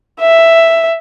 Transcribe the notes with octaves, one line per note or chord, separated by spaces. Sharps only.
E5